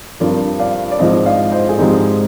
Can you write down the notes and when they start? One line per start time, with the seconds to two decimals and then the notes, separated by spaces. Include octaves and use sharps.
0.20 G2 F3 C4 A#4 D5
0.59 D5 F5
0.91 D5
0.99 G#2 F3 C4 C5 D#5
1.26 D5 F5
1.52 C5 D#5
1.69 G#4
1.78 G#2 F3 G#3 C4 D#4 G4